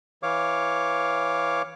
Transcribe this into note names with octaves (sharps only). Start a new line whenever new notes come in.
E3 C#5 F5 D6